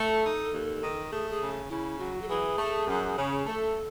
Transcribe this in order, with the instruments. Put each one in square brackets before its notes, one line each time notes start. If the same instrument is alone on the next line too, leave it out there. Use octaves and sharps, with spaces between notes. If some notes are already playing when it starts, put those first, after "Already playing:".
Already playing: [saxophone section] A3 [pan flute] A4
[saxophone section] D#4
D#2
D#3
[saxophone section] A3 [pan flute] G#4
[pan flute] G#4
[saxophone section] C#3
[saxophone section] C#3 [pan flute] E4
[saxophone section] F#3 [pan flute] F#4
[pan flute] A4
[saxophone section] E3 [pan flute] G#4
[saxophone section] A3
F#2
C#3
[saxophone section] A3 [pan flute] A4